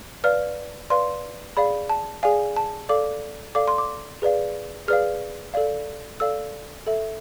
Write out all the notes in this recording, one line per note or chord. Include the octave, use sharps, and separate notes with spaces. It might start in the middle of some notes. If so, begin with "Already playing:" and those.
B4 D5 F5 F6
B4 D5 F5 C6
G#4 D5 F5 B5
A5
G#4 D5 F5 G#5
A5
A4 D5 F5 D6
A4 D5 F5 D6
C6
D6
G#4 B4 D5 F5
G#4 B4 D5 F5 F6
A4 D5 F5
A4 D5 F5 E6
A4 E5